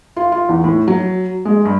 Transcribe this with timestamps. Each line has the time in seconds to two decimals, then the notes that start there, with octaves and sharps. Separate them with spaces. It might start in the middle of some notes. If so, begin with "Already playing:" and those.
0.16 F4
0.32 F4
0.49 E2
0.64 A2
0.88 F#3
1.45 G#3
1.65 G2